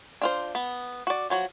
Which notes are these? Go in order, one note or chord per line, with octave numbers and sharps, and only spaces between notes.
D4 F4 C5
B3
F#4 D5
F3 F#3 F#4